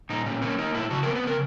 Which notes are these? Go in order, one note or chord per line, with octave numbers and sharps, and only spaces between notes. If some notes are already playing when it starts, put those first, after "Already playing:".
A#2 D#4
A#2 C#4
A#3 C#4
A#3 D#4
A#2 E4
C#3 F#4
A#4
B3
B4
C#3 A#4